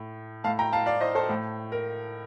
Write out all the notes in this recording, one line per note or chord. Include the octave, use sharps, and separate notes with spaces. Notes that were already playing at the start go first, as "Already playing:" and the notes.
Already playing: A2
A2 F5 A5
G5 A#5
F5 A5
D5 F5
C5 D#5
A4 C5
A2
A#4